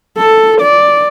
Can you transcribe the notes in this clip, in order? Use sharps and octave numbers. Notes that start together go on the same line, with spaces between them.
A4
D5